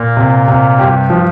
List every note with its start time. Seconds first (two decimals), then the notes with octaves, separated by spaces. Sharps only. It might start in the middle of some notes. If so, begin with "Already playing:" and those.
Already playing: A#2 A#3
0.17 C3
0.48 C3
0.79 G2 G3 G4
1.10 F3